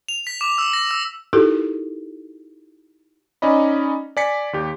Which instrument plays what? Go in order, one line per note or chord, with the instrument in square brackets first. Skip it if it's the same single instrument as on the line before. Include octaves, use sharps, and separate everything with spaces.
[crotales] F7
B6
D6
E6
A#6
E6
[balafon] D#4 E4 F#4 G4 A4 A#4
[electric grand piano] C#4 D#4 D5 D#5 B5
D5 G#5 B6 C#7
D#2 G4